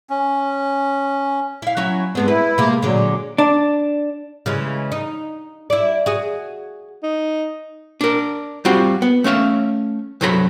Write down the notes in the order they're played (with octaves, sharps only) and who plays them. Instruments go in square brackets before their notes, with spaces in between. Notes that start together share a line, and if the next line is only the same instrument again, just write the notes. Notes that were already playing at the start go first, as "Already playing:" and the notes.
[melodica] C#4
[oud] E4 F5
F#3 C#4 E4
[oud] G2 G#3 C4 [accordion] B3
[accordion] E4 [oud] B4
[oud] C3 G#3 A#3
[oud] A#2 D3 G#3 [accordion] F#3
[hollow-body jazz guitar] D4
[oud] C#3 E3 G#3
D#4
E4 D5
F#4 G#4
[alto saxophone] D#4
[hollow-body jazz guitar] D4 A#4
G3 C4 F4 F#4
B3
A3 C#4 E5 F5
C2 G2 F#3 A4 A#5 B5